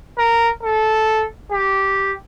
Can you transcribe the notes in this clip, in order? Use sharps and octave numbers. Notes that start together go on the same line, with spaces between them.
A#4
A4
G4